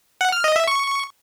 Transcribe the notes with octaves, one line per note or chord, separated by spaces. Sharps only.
F#5
F6
D#5
E5
C#6